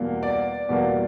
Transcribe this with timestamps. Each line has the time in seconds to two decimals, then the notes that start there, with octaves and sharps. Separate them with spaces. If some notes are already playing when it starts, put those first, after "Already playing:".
Already playing: E2 B2 G3 A#3
0.23 D5
0.69 E2 B2 G3 A#3